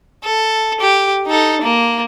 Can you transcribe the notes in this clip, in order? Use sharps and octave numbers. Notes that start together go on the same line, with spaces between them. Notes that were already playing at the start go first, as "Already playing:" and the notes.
A4
G4
D#4 A4
A#3